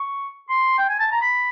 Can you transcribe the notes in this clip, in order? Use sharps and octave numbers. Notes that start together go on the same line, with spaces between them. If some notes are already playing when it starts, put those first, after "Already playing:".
Already playing: C#6
C6
G5
G#5
A5
A#5
B5